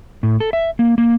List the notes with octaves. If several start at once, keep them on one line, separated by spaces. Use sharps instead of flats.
A2
A4
E5
A#3
A#3